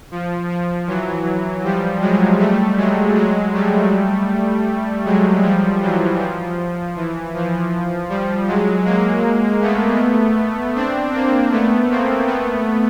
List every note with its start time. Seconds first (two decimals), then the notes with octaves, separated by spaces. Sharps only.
0.11 F3
0.50 F3
0.87 E3 F#3
1.64 F3 G3
2.01 F#3 G#3
2.39 G3 A3
2.77 F#3 G#3
3.16 F#3 G#3
3.54 G3 A3
5.05 F#3 G#3
5.43 F3 G3
5.82 E3 F#3
6.20 F3
6.96 E3
7.34 F3
8.09 F3 G3
8.47 F#3 G#3
8.85 G#3 A#3
9.61 A3 B3
10.76 C4 D4
11.13 A#3 C4
11.51 A3 B3
11.90 A#3 C4
12.27 A3 B3